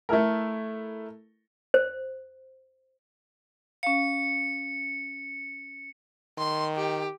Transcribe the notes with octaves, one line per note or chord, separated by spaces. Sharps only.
A3 E4 A4 A#4
C5
C#4 F5 C#7
D#3 C6
G4